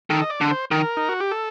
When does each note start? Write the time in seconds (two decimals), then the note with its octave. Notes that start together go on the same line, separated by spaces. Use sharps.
0.10 D#3 A4
0.22 D#5
0.30 D5
0.41 D3
0.51 C5
0.71 D#3 A#4
0.97 D#4
1.09 F#4
1.20 G4
1.31 A4